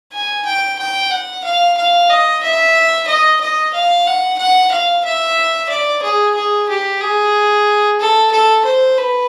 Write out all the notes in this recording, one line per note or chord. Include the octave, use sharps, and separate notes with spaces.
G#5
G5
G5
F#5
F5
F5
D#5
E5
D#5
D#5
F5
F#5
F#5
F5
E5
D5
G#4
G#4
G4
G#4
A4
A4
C5
B4